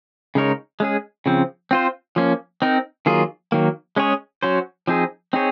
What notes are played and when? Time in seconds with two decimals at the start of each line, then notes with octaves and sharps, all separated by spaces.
0.35 C#3 G#3 D#4 A#4 C#5
0.80 G#3 C#4 G#4
1.26 C#3 F3 C4
1.71 C4 F4 C5
2.16 F3 A#3 C#4
2.62 C4 D#4 A#4
3.06 D#3 F#3 A#3 F4 G#4
3.52 D#3 F#3 A#3
3.96 G#3 C#4 G#4 C#5
4.43 F#3 C#4 F#4 C5
4.87 F3 C4 D#4 G#4
5.33 C4 D#4 G#4 C#5